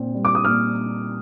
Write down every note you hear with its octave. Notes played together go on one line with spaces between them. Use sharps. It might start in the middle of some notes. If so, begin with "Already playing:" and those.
Already playing: A#2 C4
G3
D6
D#6
A#2 F6